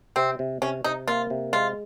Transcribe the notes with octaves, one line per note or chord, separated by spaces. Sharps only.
C3 C4
C3
C3 C#4
C3 D#4
A#3 F4
C3
G#3 F4